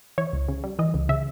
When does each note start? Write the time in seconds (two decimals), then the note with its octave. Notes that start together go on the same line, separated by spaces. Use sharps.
0.18 E3 C#5
0.33 C#2
0.48 C#3
0.64 G3
0.79 E3 D#5
0.94 C#2
1.09 C#3 E5